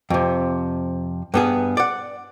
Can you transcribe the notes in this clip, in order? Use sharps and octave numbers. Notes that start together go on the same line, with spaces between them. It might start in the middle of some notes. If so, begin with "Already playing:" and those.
F2 C3
G2 B3 G#4
D5 F#5